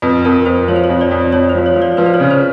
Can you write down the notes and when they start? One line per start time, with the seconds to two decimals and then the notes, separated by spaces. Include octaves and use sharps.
0.02 F2 B4
0.25 F2 A#4
0.46 F2 C5
0.68 F3 C#5
0.76 C5
0.84 C#5
0.89 F2
1.01 D5
1.11 F2
1.33 F2 C#5
1.49 C5
1.55 F3
1.66 C#5
1.76 F3
1.82 D5
1.97 F3 B4
2.06 C5
2.14 C#5
2.20 C#3
2.31 C5